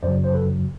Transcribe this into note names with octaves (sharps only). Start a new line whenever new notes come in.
F#2 C#3 F#3 C5 D5
C5
A4 B4